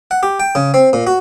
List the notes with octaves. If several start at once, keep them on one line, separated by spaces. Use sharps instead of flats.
F#5
G4
G5
C#3
C4
A#2
F#4